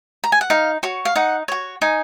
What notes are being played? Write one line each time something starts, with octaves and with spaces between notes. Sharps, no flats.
A#5
G#5
F#5
D#4 F5
F#4 C#5
F5
D#4 F#5
F#4 C#5
D#4 G#5